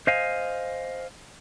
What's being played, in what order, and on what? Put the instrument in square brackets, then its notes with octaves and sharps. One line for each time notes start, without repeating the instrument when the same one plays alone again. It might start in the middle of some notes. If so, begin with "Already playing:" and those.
[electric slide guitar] C5 D#5 F5 G#5